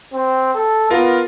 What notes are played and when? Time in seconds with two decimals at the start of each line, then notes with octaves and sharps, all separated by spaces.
0.13 C4
0.55 A4
0.90 B3 F4 A#4